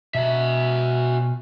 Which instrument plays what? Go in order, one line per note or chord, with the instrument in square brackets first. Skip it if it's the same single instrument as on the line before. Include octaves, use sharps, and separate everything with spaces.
[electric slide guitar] B2 D#5 A5 [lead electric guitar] F#4 E5